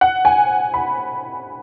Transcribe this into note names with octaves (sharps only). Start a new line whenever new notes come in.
F#5
G#5
B5